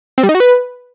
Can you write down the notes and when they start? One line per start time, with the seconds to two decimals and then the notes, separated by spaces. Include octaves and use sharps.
0.18 C4
0.23 G3
0.29 D#4
0.35 F#4
0.40 B4